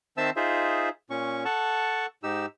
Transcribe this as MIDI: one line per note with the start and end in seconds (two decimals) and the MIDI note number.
0.17 0.30 51
0.17 0.30 60
0.17 0.30 72
0.17 0.30 76
0.17 0.30 81
0.17 0.30 88
0.36 0.89 63
0.36 0.89 65
0.36 0.89 68
0.36 0.89 72
0.36 0.89 76
1.10 1.44 46
1.10 1.44 61
1.10 1.44 85
1.45 2.06 69
1.45 2.06 78
1.45 2.06 81
1.45 2.06 85
2.23 2.46 44
2.23 2.46 63
2.23 2.46 67
2.23 2.46 88